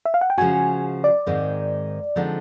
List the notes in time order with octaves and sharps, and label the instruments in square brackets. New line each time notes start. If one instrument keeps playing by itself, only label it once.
[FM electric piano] E5
F5
F#5
G5
[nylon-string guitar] C#3 F3 G#3 C#4 F#4 [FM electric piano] G#5
[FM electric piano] D5
[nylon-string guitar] G#2 D#3 G#3 C4
D3 F3 G#3 C4 D#4